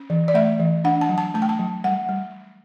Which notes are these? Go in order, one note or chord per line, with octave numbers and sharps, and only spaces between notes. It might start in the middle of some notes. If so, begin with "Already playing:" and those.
Already playing: C#4
E3
D5
A3 E5
E3
D4 F#5
A5
F#3
A5
A3 A5
G5
A5
F#3
G3 F#5
G3